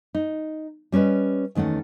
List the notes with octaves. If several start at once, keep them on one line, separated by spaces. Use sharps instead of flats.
D#4
G3 C#4 A4 B4 D#5
E2 D#3 A3 C#4 F#5